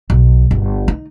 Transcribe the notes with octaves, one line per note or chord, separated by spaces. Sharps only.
B1
G1
D#4